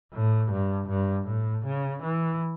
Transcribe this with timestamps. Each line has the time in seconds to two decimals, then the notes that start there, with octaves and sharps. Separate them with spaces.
0.13 A2
0.52 G2
0.89 G2
1.27 A2
1.66 C#3
2.03 E3